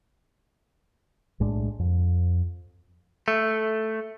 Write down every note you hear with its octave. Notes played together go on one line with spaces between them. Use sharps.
B1 A2 G#3 D4
F2
A3